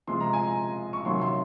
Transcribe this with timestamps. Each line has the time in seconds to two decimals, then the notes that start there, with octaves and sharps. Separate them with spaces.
0.07 C3 F3 G#3 C6
0.20 A#5
0.33 G#5
0.46 A#5
0.93 C#6
1.05 C3 D#3 F#3 C6
1.22 C6